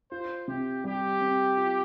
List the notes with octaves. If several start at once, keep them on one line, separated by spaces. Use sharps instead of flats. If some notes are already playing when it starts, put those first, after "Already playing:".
F4 C5
C3 G4
G3 G4
C4
F4